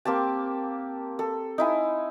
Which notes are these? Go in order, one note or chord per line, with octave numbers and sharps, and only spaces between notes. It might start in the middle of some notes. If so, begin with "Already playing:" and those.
A#3 C4 G4 A5
A4
D#4 E4 G#5